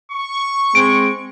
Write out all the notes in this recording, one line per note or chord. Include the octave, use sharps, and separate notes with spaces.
C#6
G#3 C4 D7